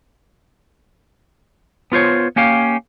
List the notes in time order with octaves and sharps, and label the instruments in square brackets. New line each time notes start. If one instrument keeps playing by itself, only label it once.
[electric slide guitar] B3 F4 C5 C#5
A#3 C#4 G4 F5